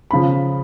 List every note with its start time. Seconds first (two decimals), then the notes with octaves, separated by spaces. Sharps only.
0.11 C#3 F3 B5